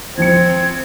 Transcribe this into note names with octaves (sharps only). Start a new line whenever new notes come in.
F3 C4 G#6 C#7